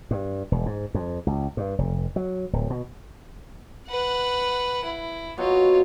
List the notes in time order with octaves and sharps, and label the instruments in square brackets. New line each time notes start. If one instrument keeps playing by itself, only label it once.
[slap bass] G2
E1
G#2
F2
C#2
G2
F1
F#3
D1
B2
[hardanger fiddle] B4 F#5
E4
[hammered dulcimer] B2 F#3 [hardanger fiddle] F4 C#5